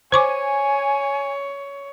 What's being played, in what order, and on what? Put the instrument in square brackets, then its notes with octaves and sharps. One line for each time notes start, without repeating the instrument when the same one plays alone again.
[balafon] C5 C#6 D6 [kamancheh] C#5 [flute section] G#5